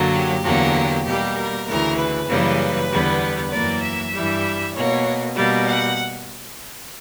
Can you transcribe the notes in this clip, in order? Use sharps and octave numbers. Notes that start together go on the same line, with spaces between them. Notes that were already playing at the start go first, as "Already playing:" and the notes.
Already playing: F#2 D3 F#3 A#3
G4
E2 D3 F#3 A#3
B2 G3 A#3 G4
A#4
D2 C#3 E3 A#4
B4
F#2 C#3 E3 G3 A#3
E2 D3 G3 B3
F#2 E3 A#3 D5
E5
G2 E3 G3
B2 A#3 C#5
B2 G3 A#3 D5
F#5